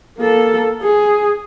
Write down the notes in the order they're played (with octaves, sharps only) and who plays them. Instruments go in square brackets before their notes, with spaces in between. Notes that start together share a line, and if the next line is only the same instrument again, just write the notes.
[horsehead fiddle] A#3 A4
G#4